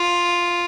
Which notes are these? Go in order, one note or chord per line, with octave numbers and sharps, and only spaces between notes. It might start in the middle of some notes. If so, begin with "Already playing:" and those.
Already playing: F4